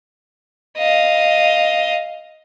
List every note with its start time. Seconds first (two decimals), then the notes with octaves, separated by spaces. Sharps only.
0.77 D#5 F5